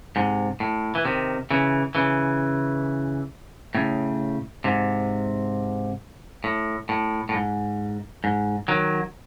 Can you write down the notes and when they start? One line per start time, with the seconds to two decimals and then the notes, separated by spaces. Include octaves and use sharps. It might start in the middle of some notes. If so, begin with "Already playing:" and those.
0.16 G#2 C3
0.60 A2
0.95 E3
1.05 C3 D#3
1.51 C#3 E3
1.95 C#3 E3
3.75 A2 C#3
4.64 G#2 C3
6.44 A2
6.89 A2
7.29 A2
7.34 G#2
8.24 G#2
8.68 D#3 F#3